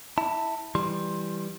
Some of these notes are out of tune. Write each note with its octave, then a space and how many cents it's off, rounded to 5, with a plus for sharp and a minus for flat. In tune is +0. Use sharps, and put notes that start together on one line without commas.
E4 -10 A5 +20
E3 +5 G3 +0 C6 +20